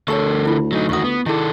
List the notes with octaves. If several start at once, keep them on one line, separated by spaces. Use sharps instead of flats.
D2 D3 A4 A#4 C#5 A5 C#6
E4 F4
F#3 D#4
E2 D#3 F#4 C#6 D#6
B3
D#3 E4 G#4 A4